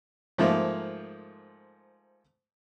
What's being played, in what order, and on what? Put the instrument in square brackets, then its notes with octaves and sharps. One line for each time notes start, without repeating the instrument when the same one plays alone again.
[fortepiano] G#2 F3 A3 A#3